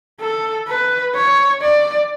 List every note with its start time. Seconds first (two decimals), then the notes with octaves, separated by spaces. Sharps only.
0.21 A4
0.69 B4
1.15 C#5
1.62 D5